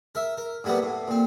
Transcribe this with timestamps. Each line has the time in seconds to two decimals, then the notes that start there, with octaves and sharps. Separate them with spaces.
0.15 A#4 E5
0.37 A#4
0.64 A2 F#3 G3 A#3 B3
0.83 A2
1.08 A#2 C4